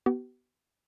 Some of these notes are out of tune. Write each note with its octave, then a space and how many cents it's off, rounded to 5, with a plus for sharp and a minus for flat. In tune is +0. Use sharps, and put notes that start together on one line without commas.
B3 +0 G4 -45